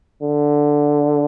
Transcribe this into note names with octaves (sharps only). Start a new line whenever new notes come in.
D3